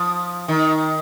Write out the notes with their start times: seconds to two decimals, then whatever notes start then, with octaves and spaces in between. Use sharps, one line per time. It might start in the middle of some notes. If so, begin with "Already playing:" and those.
Already playing: F3
0.48 D#3